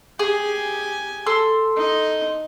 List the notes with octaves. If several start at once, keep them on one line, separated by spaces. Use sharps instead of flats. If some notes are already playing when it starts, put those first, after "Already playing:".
G4 G#4 G#5
A4 C6 E6
D#4 D#5